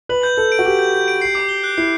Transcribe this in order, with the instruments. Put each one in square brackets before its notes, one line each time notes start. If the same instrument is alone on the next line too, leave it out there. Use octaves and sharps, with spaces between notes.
[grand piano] B4 [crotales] F#7
[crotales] G6
[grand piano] A4 [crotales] G6
[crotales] D7
[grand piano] F#4
[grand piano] G4 [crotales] F#7
[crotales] G6
G6
D7
C7
D6
G7
F#6
[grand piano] E4 [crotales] C7